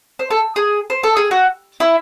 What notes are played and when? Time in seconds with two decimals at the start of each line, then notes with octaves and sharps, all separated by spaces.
0.19 C5
0.31 A4
0.56 G#4
0.90 C5
1.03 A4
1.17 G#4
1.31 F#4
1.80 E4